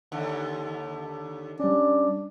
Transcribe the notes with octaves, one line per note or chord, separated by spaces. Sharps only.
D#2 D3
G3 C#4 D4